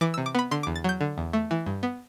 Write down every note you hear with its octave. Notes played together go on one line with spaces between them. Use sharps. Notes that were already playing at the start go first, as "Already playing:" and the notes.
E3 D6
E6
C3
D6
B3 B5
D3 C6
D6
E2
A6
F#3 G6
D3
E2
A3
E3
G2
B3